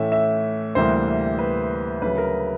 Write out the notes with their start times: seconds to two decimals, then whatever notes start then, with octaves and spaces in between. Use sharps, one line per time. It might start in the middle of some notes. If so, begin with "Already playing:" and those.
Already playing: A2 E3 A3 C#4 E5
0.12 E5
0.75 D2 C3 E3 G3 A#3 C5
1.38 B4
2.02 D2 C#3 F#3 B4
2.18 A#4